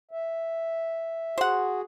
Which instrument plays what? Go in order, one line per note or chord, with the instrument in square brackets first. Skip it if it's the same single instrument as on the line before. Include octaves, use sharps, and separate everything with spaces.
[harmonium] E5
[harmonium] F#4 G#4 [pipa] C5 F#5